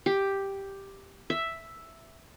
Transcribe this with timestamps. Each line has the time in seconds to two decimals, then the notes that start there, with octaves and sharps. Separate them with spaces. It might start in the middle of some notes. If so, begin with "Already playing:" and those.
0.06 G4
1.30 E5